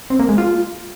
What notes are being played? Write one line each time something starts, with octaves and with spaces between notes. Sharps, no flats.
C4
A#3
G#3
F4